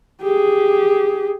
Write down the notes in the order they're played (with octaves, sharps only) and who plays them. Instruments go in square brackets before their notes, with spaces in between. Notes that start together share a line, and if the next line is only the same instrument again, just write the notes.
[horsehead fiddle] G4 G#4